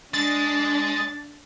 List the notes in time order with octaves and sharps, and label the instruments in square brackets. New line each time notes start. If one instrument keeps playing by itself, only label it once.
[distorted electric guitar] G#3 [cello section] D4 [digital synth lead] A6